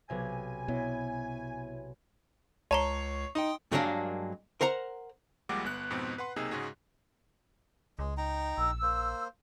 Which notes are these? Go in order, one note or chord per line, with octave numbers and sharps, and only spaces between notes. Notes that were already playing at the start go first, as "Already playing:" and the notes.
B1 C3 G#5 G#6
B2 E4 C#5 E5
C#2 C#5 A5 A#5 C#6 C7
D#4 G5 C6 D#6
G2 F#3 G#3 A#3 D4 A#4
A#4 C5 F#5 A#5
A#1 A#2 G3 G#3 F#5 D6
G1 B3 F#6
F2 G#2 B2 B3 C4
B4 F#5 C6
B1 C3 A#3 D#4 G#4 E6
G#2 C#3 G#3 F#4 G#4
C#2 G#3
D#4 G5 A#5
A#1 E6
A#3 C5